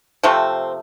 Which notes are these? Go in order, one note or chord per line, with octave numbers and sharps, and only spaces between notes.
C3 F3 A3 C4